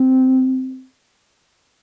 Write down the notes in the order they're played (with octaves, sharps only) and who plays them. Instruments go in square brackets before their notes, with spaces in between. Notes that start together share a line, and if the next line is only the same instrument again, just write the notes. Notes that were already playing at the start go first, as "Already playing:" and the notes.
Already playing: [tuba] C4